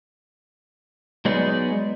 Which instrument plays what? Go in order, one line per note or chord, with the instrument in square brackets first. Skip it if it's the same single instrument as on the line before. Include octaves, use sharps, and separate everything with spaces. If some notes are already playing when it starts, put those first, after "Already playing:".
[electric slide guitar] F#3 G#3 B3 D#4 G#4 D5